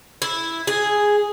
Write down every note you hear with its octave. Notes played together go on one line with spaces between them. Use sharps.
E4
G#4